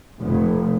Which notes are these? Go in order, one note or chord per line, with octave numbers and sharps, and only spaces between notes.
F1